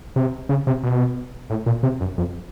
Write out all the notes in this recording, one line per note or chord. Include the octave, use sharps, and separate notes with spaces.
C3
C#3
C3
B2
A2
A#2
C3
F#2
F2